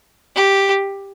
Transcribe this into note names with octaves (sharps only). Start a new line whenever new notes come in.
G4